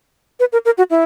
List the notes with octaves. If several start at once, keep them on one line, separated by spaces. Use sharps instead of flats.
B4
A#4
A#4
F#4
E4